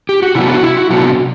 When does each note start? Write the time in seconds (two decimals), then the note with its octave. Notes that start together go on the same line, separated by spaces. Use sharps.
0.09 G4
0.22 F#4
0.35 C3 F#3 B3 D4 E4
0.50 F#4
0.63 E4
0.77 F#4
0.90 C3 F#3 B3 D4 F#4